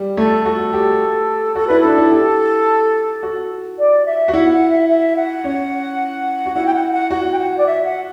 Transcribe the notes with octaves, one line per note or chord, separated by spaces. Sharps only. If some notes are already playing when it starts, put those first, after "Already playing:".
Already playing: G3
A3 A4
F#4 A4
G4
F#4 A4
E4 B4
D4 A4
E4
G4
F#4
D5
E5
F#4
E4 F#5
F#5
E5
E5
F#5
C#4
F#4
E4 F#5
G5
F#5
F#5
F#4 F#5
G5
F#5
D5
E5
F#5